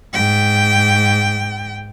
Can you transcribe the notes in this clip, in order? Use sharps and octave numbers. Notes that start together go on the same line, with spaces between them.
G#2 G5